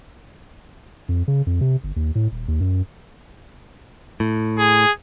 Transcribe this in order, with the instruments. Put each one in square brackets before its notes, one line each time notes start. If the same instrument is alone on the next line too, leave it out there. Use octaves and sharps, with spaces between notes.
[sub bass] F2
C#3
F2
C3
G1
D#2
A2
D#1
D#2
F#2
[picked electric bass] A2
[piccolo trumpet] G#4